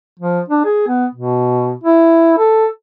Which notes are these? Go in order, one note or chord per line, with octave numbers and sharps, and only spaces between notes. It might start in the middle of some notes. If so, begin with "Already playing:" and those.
F3
D4
G#4
B3
B2
E4
A4